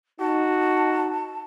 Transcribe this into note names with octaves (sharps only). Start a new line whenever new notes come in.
D#4 F#4 A5